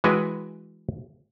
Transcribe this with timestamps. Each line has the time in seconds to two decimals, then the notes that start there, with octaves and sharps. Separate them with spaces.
0.04 E3 G#3 F#4 B4 G5 G#5